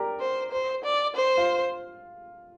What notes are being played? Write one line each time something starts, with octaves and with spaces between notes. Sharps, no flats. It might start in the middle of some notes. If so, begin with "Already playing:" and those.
Already playing: G4 A#4 D5
C5
C5
D5
C5
F4